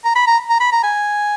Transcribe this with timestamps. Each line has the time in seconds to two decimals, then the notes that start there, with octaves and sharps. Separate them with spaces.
0.05 A#5
0.15 B5
0.27 A#5
0.49 A#5
0.60 B5
0.72 A#5
0.83 G#5